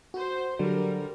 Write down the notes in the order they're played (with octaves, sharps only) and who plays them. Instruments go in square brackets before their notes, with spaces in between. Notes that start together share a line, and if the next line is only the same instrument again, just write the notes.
[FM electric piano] F#4 [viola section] C5
[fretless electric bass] D3 [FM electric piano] F#3 [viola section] G3 A#4